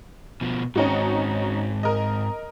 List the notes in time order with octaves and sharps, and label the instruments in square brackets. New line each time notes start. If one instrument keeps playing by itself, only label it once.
[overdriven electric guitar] B2 F3
[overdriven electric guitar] G#2 C4 [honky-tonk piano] C#4 D#4 F#4
[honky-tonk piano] A#4 D#5